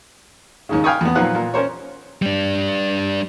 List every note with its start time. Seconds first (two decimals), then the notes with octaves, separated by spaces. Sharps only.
0.69 D#2 G#2 C#3
0.84 F5 G5 G#5 B5 C#6 D#6
1.01 E2 B3
1.15 A#2 D#3 F3 F#3 B4 F#5
1.35 A#2
1.54 C#4 A#4 C5 C#5
2.22 G3 D4